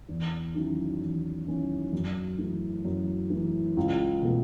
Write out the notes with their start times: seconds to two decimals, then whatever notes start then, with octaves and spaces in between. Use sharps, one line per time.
0.09 E2
0.55 D#3 F#3 C#4 E4
1.00 E2
1.47 D#3 F#3 C#4 E4
1.93 F#2
2.38 E3 A3
2.85 F#2
3.30 E3 A3
3.77 C#2
4.22 B2 A3